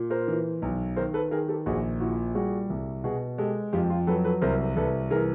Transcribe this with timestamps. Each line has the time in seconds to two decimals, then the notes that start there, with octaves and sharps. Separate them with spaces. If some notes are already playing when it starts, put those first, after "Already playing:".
Already playing: A#2
0.10 A#4 C5
0.28 E3
0.62 B1
0.96 D#3 A#4 C5
1.14 A4 B4
1.31 D#3 G#4 A#4
1.48 G4 A4
1.66 A#1 F#4 G#4
2.00 A#2 E4 F#4
2.35 G3 F#4 G#4
2.70 C2
3.04 B2 F#4 G#4
3.38 G#3 G4 A4
3.73 F2 F4 G4
3.90 F4
4.07 F#3 A4 B4
4.24 A4 B4
4.42 C2 A#4 C5
4.76 C2 A4 B4
5.10 E3 G#4 A#4